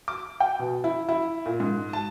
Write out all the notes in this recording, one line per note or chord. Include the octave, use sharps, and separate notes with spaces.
D6
G5
B2
E4
E4
A#2
G#2
A5